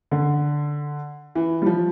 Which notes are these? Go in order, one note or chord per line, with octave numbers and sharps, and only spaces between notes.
D3
E3
G3
F3